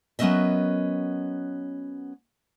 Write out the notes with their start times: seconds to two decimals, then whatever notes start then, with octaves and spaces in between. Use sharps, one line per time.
0.19 F#3 B3 C#4 A#4 D#5 E5